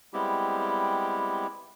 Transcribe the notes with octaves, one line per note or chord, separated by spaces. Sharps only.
G3 G#3 B3 C4 E4 G4